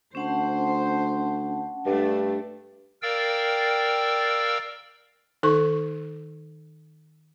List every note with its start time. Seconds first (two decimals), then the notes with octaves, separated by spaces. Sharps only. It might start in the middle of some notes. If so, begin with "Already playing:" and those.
0.15 D2 C#4 C5 F#5 A5
1.86 G2 A3 D4
3.02 A#4 D5 F5 G5 E6
5.43 D#3 D#4 A4 C#6